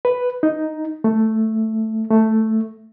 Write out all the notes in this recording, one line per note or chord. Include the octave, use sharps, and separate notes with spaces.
B4
D#4
A3
A3